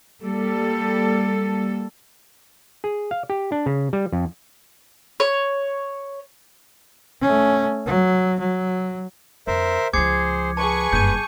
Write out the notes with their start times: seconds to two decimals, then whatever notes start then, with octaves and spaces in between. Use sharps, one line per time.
0.23 G3 A#3 A4
2.84 G#4
3.11 F5
3.30 G4
3.52 D4
3.66 C#3
3.93 G3
4.12 F2
5.20 C#5
7.22 A3 C#4
7.86 F#3
8.39 F#3
9.47 F2 D3 A#4 C5 E5
9.93 C#2 F3 G#4 C5 D6 G#6 C#7
10.57 G#4 B4 A5 C#6
10.93 F#1 G2 G6 D#7